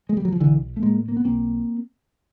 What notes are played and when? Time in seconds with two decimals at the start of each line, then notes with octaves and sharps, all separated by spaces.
0.09 G#3
0.17 G3
0.25 F#3
0.32 F3
0.40 B1 D3 E3
0.76 A3
0.82 A2 G#3 A#3
1.08 A#3
1.17 B3
1.25 B1 A#3 C4